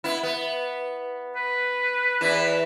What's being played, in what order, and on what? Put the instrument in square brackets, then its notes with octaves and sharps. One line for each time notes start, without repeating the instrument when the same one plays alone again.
[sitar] B3 E4
B3
[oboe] B4
[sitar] E2 E3 E4